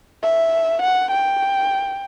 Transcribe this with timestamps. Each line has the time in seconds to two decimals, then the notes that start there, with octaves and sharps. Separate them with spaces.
0.23 E5
0.82 F#5
1.11 G5